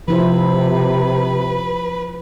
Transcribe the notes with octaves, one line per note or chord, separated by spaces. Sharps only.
C3 F3 E4 B4 C5